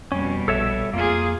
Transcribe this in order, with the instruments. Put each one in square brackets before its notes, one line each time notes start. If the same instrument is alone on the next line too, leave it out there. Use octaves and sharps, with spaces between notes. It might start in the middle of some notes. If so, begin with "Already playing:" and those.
[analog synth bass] F2 [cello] B2 G3 [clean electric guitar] C#4
[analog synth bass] A#1 [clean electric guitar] A4 C#5 E5
[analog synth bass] F2 [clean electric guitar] A#3 [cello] F4 G#4